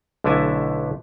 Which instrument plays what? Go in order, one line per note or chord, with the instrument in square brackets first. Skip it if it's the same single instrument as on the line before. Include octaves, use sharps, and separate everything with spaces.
[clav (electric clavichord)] B1 D3 A3 D4 E4 G#5